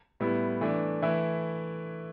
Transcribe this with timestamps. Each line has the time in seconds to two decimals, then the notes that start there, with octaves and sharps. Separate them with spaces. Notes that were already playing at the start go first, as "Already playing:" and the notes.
0.20 A2 G3 B3 E4
0.61 E3 A3 D4
1.02 E3 A3 E4